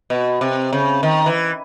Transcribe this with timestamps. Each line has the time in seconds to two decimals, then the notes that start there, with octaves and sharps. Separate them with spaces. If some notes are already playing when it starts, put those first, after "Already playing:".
0.10 B2
0.41 C3
0.73 C#3
1.03 D#3
1.26 E3